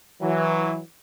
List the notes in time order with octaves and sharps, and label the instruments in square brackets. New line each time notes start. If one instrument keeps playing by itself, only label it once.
[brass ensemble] E3 F#3